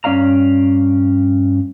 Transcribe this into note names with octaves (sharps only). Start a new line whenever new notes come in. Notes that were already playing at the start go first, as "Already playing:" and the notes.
G2 C#4 D5 F5 A#5